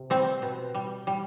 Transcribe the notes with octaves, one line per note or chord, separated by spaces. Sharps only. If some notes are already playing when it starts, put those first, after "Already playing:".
Already playing: C3
G3 C4
B2
G3
G3